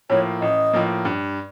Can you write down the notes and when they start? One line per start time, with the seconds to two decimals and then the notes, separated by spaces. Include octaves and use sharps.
0.10 A2 F3 A#3 C#5
0.41 A1 D#5
0.73 A2 F3 A#3
1.05 G2